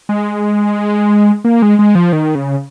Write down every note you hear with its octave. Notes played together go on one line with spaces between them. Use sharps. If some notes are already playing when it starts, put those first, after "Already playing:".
G#3
A#3
G#3
G#3
F3
D#3
C#3